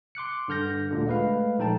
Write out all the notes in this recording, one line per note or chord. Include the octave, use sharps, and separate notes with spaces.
C6 D6 F#6 C#7
G2 D3 F6 G6 A#6
D2 A#2 D3
G#3 A3 B4 F5
A#1 G#3 D#4 A4 G5 A5